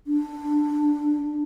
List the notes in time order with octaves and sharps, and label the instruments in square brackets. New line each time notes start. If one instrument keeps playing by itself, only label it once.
[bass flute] D4